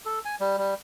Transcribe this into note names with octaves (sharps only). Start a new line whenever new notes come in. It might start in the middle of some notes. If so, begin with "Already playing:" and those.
A4
G#5
G3
G3